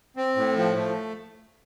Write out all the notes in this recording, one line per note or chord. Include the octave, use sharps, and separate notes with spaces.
C4
A2
F3
A3